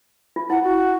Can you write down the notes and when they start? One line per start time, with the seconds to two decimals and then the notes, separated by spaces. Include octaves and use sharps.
0.36 F4
0.50 E4 F#5
0.64 F#4